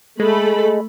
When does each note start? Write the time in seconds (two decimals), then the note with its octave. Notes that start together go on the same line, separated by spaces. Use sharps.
0.20 G#3 A3 A4 B5